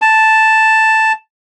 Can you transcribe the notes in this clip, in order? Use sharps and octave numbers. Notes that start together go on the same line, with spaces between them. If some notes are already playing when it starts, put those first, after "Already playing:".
A5